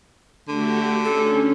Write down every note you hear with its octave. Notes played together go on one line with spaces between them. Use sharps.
D3 A3 F#4 G4
C#4 A4